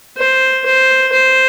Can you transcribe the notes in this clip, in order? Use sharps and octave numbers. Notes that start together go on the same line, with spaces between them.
C5
C5
C5